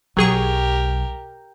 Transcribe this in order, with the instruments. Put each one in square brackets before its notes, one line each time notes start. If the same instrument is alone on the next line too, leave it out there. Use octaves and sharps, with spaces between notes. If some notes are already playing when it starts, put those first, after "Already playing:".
[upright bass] B1 [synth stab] F#3 G#4 C#6 [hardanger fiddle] G4 A#4